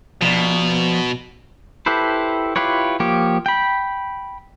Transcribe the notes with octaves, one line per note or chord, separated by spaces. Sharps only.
B2 F3 D5
E4 G4 A4 B4 C5
E4 F4 G4 B4 C#5
F3 A#3 G4 C#5
G5 B5